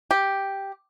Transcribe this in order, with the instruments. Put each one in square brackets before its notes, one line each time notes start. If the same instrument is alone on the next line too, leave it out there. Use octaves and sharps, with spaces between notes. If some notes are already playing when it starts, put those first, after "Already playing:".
[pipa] G4